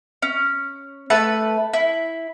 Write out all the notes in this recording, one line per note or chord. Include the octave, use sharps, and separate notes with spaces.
C#4
A3 B4 A5
E4